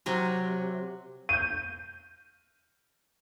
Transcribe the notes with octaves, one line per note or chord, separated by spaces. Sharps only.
C3 F#3 A#5
G6 D#7